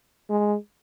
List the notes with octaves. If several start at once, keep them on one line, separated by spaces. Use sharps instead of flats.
G#3